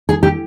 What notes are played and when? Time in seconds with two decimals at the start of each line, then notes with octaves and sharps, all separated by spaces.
0.09 G#4
0.23 G4